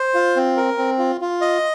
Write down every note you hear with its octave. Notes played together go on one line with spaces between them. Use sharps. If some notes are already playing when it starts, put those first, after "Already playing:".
Already playing: C5
F4
C4
A#4
C4
F4
F4
D#5